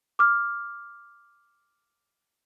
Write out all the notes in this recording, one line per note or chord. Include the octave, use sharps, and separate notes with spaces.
D6 F6